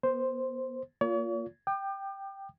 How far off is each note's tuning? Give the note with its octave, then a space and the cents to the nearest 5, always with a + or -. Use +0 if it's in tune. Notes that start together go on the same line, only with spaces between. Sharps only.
B3 -35 C5 +0
A#3 +0 F4 +0 C#5 +45
G5 +0 D6 +40